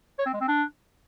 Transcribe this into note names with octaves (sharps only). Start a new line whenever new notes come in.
C#5
C4
G#3
C4
D4